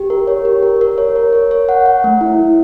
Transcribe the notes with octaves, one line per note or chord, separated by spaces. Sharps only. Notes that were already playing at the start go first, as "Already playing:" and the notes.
Already playing: G4
A#4
C#5
G4
A#4
A#4
C#5
A#4
C#5
C#5
F#5
F#5
A3
E4
A3